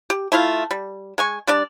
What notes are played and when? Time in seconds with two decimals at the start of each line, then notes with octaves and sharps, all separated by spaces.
0.10 G4
0.32 A3 E4 F4 F5
0.71 G3
1.18 G#3 G#5 C#6
1.47 G3 D4 D5